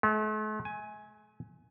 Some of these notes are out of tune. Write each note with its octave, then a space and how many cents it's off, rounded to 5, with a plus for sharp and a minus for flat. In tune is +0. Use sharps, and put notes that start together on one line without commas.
A3 -45
G#5 +10